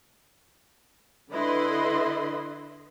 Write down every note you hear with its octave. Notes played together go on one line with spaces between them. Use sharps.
D3 E4 B4 D#5 B5 C6